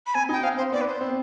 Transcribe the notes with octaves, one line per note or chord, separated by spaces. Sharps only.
B5
C4 G#5
D#4 G5
C4 F5
C5
B3 D5
B4
C5
C4